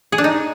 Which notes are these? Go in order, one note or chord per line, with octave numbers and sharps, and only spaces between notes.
G#4
D4
D#4